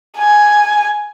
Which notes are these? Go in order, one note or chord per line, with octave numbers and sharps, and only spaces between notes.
G#5